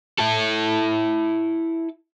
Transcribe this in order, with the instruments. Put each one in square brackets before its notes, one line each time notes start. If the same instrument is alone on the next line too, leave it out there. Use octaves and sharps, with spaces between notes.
[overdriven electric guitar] E4 A4